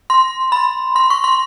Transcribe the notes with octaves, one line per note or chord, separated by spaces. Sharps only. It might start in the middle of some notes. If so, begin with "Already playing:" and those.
C6
B5
C6
C#6
C6